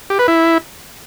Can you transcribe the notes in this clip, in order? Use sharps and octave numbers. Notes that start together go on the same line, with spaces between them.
G4
B4
E4